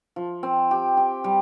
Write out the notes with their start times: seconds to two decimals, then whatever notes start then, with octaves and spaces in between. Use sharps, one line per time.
0.16 F3
0.43 C4
0.71 G4
0.97 G4
1.24 G3